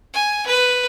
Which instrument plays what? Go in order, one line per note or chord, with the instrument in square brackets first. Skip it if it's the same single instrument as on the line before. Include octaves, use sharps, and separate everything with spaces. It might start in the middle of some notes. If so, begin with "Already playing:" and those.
[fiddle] G#5
B4